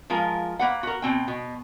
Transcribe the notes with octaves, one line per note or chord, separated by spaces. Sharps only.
F3 G#3 F4 A#4
A#3 B4 F#5
F#4 A#4
B2 C4 G5
B2